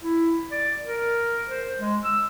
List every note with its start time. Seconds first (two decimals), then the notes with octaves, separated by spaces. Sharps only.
0.01 E4
0.51 D5
0.84 A#4
1.48 C5
1.78 G#3
2.04 E6